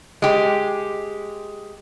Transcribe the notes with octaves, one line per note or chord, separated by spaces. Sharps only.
G#3 G4